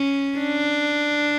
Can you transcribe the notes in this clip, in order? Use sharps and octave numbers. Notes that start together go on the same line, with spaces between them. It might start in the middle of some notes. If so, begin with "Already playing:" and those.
Already playing: C#4
D4